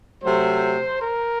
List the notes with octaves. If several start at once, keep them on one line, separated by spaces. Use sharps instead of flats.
C3 F#3 A3 C5
A#4